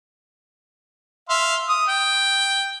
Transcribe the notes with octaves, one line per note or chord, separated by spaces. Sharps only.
E5 F5 C6
D#6
G5